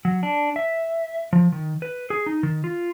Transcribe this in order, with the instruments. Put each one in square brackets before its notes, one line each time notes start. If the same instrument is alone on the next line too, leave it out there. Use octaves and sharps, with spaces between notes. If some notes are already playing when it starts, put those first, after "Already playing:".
[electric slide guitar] F#3
D4
E5
F3
D#3
B4
G#4
D#4
D#3
F4